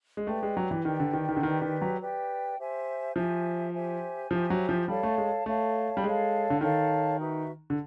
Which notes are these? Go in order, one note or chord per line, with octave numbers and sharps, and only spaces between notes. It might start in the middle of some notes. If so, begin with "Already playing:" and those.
G#3
A3 G4 B4 D5 G5
G#3
F#3
E3
D#3 G4 B4 D5 G5
D3
D#3
D#3
D3
D#3 G4 B4 D5 G5
D#3
F#3
G4 B4 D5 G5
G4 C5 E5 G#5
F3 G4 C5 E5 G#5
G4 C5 E5 G#5
F3 G4 C5 E5 G#5
F#3
F3
G3 A4 C#5 F5 A5
A3
G#3
A3 A4 C#5 F5 A5
G3
G#3 A4 C#5 F5 A5
D3
D#3 A4 C#5 F5 A5
D#4 F#4 B4 E5
D3